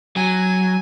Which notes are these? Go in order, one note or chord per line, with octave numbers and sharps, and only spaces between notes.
F#3 G#5